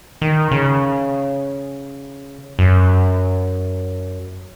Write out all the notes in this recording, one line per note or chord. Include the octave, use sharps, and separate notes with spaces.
D#3
C#3
F#2